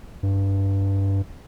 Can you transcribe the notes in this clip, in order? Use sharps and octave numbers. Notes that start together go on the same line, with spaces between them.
G2